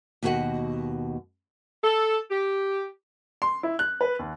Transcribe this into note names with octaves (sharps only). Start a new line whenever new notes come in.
D#2 B2 F#4 A#4 D#5 F#5
A4
G4
C6
E4
F#6
B4
D#2